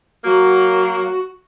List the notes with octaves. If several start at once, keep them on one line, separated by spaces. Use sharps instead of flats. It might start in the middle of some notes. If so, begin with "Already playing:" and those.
F#3 A#3 F#4